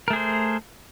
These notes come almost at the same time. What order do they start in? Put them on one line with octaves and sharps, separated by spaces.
A#4 A3 G#4 C5